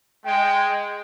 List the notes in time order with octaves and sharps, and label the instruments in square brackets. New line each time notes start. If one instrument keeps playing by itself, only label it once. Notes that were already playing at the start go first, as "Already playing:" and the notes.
[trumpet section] G#3 [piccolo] G5